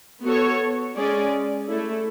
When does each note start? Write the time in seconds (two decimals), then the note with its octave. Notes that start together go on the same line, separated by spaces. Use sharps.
0.25 B3 F#4 A4 C#5
0.96 G#3 C#4 G#4 D5
1.68 A3 E4 A4